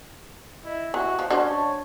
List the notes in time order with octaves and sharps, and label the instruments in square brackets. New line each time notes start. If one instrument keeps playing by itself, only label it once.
[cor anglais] E4 [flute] D#5
[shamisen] E3 [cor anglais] F#4
[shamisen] F3 [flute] C5
[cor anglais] C#4 [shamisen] D4 F#4 C5 [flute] D#5
[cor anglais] C#5 [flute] A5